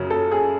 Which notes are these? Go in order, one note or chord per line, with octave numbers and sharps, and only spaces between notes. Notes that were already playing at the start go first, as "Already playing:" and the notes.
Already playing: F#2 C#3 F#3
A4
G#4